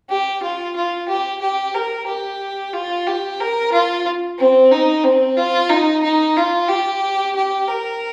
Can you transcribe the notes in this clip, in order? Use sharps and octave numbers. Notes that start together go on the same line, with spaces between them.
G4
F4
F4
G4
G4
A#4
G4
F4
G4
A#4
F4
C4
D#4
C4
F4
D#4
D#4
F4
G4
G4
A#4